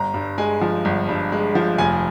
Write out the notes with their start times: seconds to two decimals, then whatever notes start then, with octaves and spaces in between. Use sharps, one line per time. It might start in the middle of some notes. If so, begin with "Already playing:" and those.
Already playing: G1 A#5
0.14 G2
0.38 G#3 G#5
0.62 F3
0.85 G1
1.09 G2
1.32 G#3
1.55 F3
1.78 F1 G#5